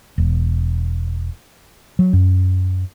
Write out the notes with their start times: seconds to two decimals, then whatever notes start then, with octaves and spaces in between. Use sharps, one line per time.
0.18 E1
1.99 F#3
2.13 F#2